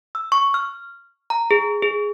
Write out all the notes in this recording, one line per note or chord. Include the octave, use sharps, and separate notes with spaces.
E6
C#6
F6
A#5
G#4
G#4